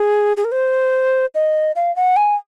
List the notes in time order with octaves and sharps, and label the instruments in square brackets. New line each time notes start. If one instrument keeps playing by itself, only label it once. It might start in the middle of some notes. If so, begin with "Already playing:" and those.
Already playing: [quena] G#4
G#4
A#4
C5
D#5
F5
F#5
G#5